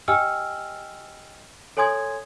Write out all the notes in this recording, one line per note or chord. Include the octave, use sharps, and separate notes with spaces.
G4 D#5 G5 G#5 E6 F6
A4 C#5 G#5 C6 D#6 G#6